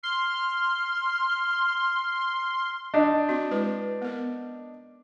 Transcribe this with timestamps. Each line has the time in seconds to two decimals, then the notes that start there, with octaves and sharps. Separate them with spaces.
0.03 C6 F6
2.94 D4 D#4
3.29 C4 F#4
3.51 G#3 E4 B4
4.02 B3 A#4